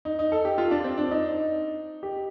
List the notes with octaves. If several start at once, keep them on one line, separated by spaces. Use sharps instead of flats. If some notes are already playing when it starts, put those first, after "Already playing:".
D#4
D#4
A4
G4
F4
D4
C4
D4
D#4
G4